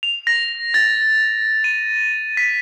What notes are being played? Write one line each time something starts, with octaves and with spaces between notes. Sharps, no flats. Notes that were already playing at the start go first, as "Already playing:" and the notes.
F7
A#6
A6
D#7
B6